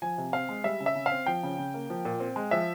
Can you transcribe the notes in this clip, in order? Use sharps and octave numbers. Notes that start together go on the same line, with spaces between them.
F3 G#5
C3
C4 F5
G#3
G3 E5
C#3
E5
C#3
F5
C4
F3 G5
C#3
C#3
A#3
F3
A#2
C4
G#3
F3 E5